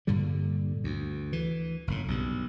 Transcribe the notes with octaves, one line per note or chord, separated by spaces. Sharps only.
G2 A#2 D3 G3
D2
E3
F#1 A2
B1 G2